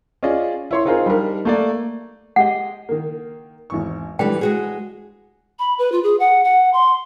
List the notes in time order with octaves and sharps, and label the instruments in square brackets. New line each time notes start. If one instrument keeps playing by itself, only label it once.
[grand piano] C#4 F4 G#4 D5 D#5
E4 C#5 C6
C4 D#4 F4 G#4 A#4 C5
G3 D4 D#4 G4 A#4
A3 A#3 D5
[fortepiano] G#3 G4 D#5 [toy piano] F#5
[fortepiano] D#3 A#3
G#1 E2 C#6
[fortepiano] G#2 D4 A4 [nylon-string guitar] E3 G3 [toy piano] G5
[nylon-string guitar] G#3 F#4 G#4
[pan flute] B5
B4
F4
G#4
F#5
F#5
C6